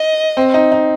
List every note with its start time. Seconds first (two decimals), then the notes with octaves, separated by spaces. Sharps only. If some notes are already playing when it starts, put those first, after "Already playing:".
Already playing: D#5
0.37 C4
0.54 D#4
0.72 D#4